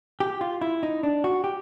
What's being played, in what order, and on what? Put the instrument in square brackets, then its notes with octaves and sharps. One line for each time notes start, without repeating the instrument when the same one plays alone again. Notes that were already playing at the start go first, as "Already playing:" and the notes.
[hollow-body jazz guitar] G4
F4
E4
D#4
D4
F#4
G4